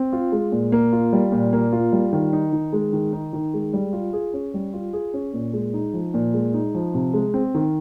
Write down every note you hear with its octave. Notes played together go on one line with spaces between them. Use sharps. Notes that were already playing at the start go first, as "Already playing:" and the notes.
Already playing: C4
F4
G#3
A#2
A#3
F4
G3
A#2
A#3
F4
G3
D#3
D#4
D#3
G#3
D#3
D#4
D#3
G#3
G3
F4
G#4
C#4
G3
F4
G#4
C#4
A#2
G#3
D#4
F3
A#2
G#3
D#4
F3
C3
G#3
C4
D#3